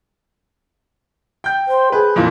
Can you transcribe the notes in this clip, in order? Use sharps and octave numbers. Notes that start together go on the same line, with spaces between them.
G5 G6
C5
G#4 B4
F2 A#2 E3